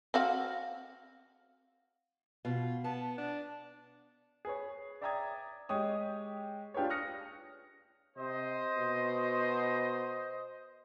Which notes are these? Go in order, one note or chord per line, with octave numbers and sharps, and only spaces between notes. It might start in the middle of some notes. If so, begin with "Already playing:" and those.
C4 F#4 F5
B2 F4
B3 A5
D4
G#4 B4 C#5
D5 E5 G5 A#5 D#6 G#6
G#3 G4 C#5 D#6
D4 F4 G4 G#4 B4 C#5
D#6 F6 F#6 A#6 C#7
C3 C5 D#5
B2